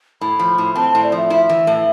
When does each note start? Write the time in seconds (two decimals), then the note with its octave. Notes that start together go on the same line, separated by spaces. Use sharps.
0.21 A2 B5
0.39 F3
0.58 A2
0.76 C4 A5
0.90 A5
0.95 A2
1.03 D5
1.12 F3 E5
1.30 E4
1.49 E3
1.67 A2